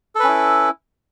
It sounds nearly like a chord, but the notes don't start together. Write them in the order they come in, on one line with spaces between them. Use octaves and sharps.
A4 B4 C#4 E4